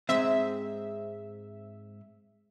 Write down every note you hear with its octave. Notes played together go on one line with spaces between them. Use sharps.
G#2 G#3 C4 E5